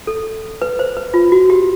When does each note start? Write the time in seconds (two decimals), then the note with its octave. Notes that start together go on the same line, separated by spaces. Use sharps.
0.07 A4
0.62 B4
0.79 C5
0.97 B4
1.14 F4
1.32 F#4
1.50 G4